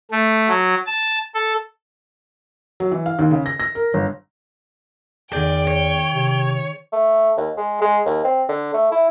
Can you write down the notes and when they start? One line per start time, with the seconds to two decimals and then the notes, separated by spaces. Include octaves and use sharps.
0.11 A3
0.48 F#3
0.86 A5
1.35 A4
2.80 F#3
2.91 E3
3.06 F5
3.19 D#2
3.31 C#3
3.46 A#6
3.60 A#6
3.75 A#4
3.94 G1
5.33 E2 D#3 G#4 D5 G5 G6
5.67 C#5
6.13 C3
6.93 A3
7.37 D#2
7.57 G#3
7.81 G#3
8.06 D#2
8.24 C4
8.49 D3
8.74 A3
8.92 E4